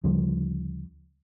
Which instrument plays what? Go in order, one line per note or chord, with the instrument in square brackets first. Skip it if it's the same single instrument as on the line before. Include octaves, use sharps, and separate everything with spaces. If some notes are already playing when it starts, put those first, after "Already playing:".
[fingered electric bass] D2 C#3 F3 G3